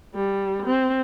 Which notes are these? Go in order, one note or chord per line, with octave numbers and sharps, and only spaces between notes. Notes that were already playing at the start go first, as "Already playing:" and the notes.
G3
C4